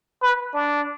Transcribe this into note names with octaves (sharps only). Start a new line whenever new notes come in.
B4
D4